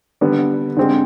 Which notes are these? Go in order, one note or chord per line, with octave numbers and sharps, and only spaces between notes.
D3 G3 B3
D3 G#3 C4 G4